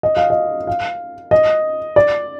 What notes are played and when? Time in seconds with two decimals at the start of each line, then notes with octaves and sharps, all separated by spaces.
0.03 D#5
0.17 F5
0.30 D#5
0.67 F5
1.31 D#5
1.96 D5